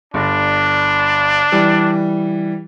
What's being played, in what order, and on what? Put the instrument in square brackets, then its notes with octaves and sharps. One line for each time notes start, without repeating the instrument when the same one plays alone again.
[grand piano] G1 [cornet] D4
[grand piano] E3 G3